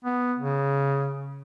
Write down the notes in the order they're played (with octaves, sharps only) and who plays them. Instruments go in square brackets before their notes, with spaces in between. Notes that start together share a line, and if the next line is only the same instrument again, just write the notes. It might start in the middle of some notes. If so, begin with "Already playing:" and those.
[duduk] B3
C#3